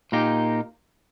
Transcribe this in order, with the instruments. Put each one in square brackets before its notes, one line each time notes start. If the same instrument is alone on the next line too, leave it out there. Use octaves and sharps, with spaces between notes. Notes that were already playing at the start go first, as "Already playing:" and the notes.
[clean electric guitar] A#2 A#3 D#4 G4